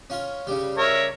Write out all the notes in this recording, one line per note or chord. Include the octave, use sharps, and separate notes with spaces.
C#4 F4
C#3 G3
A#4 C#5 E5